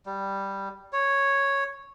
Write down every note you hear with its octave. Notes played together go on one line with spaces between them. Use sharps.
G3
C#5